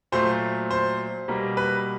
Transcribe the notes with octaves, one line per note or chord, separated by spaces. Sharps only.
A#2 F#3 A3 C5
C5
B2 G3 A#3
B4